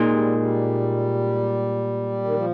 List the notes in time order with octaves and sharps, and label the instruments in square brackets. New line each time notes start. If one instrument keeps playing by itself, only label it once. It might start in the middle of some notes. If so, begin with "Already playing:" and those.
Already playing: [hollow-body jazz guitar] A#2 G#3 D#4
[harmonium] G3
G3
D#3
F3